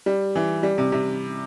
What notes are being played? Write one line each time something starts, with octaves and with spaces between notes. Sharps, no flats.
G3
E3
G3
C3
C3